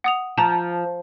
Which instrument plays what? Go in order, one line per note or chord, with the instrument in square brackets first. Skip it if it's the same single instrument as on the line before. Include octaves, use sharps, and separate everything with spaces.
[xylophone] F#5 D#6 F7
[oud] F3 [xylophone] A5 A#5